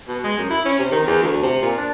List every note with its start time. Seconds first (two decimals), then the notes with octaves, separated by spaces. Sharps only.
0.08 B2
0.24 G#3
0.38 F#2
0.51 E4
0.65 C#4
0.79 C3
0.92 D#3
1.07 E2
1.22 D2
1.43 C3
1.62 A#2
1.78 D4